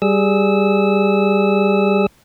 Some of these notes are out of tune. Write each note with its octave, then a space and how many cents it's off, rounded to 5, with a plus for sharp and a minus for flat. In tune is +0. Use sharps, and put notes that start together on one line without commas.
G3 +0 G#4 +0 E6 -20